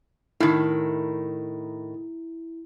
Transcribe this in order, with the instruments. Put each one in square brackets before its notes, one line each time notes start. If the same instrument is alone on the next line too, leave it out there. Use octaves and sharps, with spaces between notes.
[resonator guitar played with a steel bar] A2 D#3 [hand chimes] E4